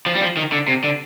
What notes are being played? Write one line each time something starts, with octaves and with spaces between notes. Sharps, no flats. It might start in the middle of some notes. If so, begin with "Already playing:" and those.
F3
G3
F3
D#3
D3
C3
D3